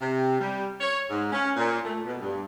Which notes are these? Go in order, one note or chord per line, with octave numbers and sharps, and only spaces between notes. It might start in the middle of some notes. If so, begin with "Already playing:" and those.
C3
G3
C#5
G#2
C#4
A#2
A3
B2
G2